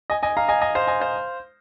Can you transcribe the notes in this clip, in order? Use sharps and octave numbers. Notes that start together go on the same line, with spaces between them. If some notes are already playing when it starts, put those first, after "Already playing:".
D#5 G#5
D#5 G#5
F5 A#5
D#5 G#5
D#5 G#5
C5 F5
D#5 G#5
C5 F5